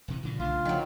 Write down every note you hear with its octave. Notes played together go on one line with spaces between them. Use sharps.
D#1 C3 E3
G2 A#2 C#3 E3
B1 C#3 A3 D4 F4
D#3 F3 F#3